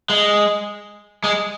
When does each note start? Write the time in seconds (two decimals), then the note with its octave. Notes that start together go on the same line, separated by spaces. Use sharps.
0.10 G#3
1.24 G#3